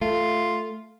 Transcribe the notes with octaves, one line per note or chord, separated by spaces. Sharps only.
A3 F4